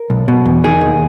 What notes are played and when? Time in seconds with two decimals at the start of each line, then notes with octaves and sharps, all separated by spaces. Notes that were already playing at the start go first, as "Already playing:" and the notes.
Already playing: A#4
0.10 B1
0.28 B2
0.46 E2
0.64 D#3 G#4
0.81 D#2